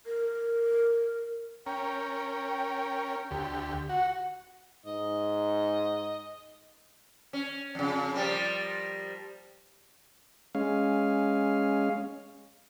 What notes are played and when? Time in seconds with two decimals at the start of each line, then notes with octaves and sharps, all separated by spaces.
0.07 A#4
1.66 C#4 A#4 G5
3.31 D2 G4
3.89 F#4 F#5
4.86 G#2 D#4 D#5
7.33 C#4
7.75 F2 C#3
8.14 F3 G3 A#3
10.55 G#3 C#4 F5